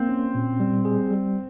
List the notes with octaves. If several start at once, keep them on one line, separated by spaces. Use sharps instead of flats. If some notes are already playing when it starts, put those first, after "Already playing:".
Already playing: A#3 C4
C#4
A#2
G3
G#4
G3